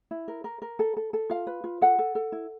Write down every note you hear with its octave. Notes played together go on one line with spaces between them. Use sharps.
E4
A#4
A#4
A#4
A4
A4
A4
F4 F5
B4
F4
A4 F#5
A4
A4
E4